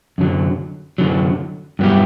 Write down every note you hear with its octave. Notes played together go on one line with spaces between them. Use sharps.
F#2 D3 F#3
F#2 D3 F#3
G2 F#3 B3 E4 G4